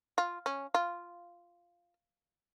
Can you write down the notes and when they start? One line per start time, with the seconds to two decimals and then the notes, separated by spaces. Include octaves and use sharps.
0.18 F4
0.46 C#4
0.74 F4